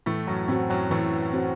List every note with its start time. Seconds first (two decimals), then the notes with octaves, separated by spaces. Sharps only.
0.06 A2 E3 A3
0.27 F#2 F#3
0.48 A2 A3 C4 F#4
0.70 F#2 F#3
0.90 A2 E3 A3
1.33 C4 F#4